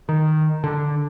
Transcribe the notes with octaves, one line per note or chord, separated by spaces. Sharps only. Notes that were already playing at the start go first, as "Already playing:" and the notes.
D#3
D3